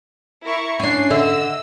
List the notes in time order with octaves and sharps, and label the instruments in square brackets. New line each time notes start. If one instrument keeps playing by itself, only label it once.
[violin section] E4 A#4 C#6
[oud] C#4 D4 [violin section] C7
[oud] D3 E5 [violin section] D#5 E6